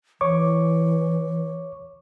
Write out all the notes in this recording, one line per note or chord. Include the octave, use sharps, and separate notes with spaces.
E3 C#5 C#6 D6